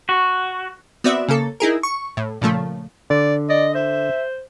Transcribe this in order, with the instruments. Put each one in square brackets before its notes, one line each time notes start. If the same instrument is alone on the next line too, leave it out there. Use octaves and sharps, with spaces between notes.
[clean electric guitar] F#4
[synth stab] B3 C4 F#4 D5 E5
C#3 A#3 A4
D#4 E4 G#4 A#4
C#6
A2
A#2 C#3 F3 A3
[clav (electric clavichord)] D3 [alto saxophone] D5
[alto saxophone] D5 [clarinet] D#5
[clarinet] C5 [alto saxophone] E5